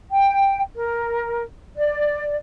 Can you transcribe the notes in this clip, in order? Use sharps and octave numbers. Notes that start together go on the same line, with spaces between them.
G5
A#4
D5